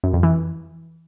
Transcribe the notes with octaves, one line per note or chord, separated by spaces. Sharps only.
F#2
F2
E3